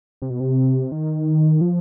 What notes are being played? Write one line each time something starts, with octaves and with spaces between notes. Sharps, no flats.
C3
B2
C3
D#3
F3